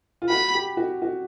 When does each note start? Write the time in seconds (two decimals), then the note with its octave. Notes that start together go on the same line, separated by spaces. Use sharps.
0.22 F4
0.29 F#4 B5
0.54 G4
0.77 F#4
1.02 F#4